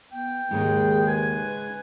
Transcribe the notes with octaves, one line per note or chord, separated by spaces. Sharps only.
B3 G5
D#2 G#2 C#3 G#3 G#4
B4 G#5